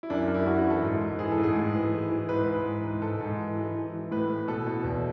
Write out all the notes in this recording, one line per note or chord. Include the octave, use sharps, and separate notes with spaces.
E4
F#2 D4
F#2
E4
F#2 F#4
F#4
E3
A4
G#2
G#2
E3 G#4
A4
G#2
G#4
A2
E3
E3
E3
G#2 B4
G#2 B4
E3
G#2
G#2 A4
G#2
E3
E3
E3
E3
A2 B4
A2
B2 A4
B2
E2